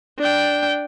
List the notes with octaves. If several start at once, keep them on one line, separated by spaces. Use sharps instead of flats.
D4 G5